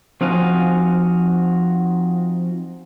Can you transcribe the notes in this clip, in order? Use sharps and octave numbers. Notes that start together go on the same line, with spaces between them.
F3 C4 D#4 F#4 F5 G#5